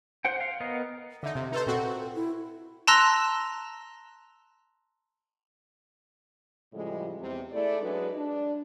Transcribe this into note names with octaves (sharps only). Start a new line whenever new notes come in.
C5 F#5 G5
F5
B3 A#4 D#5
D3 D#4 E5
C3
D#4 A4 B4 C5
A#2 C4 F#4 A4
E4
A5 A#5 C6 E6 F#6 A#6
A2 C#3 F3 G3 G#3
E2 C3
A3 E4 G#4 D5
F#3 G#3 D4 E4 G#4 B4
D4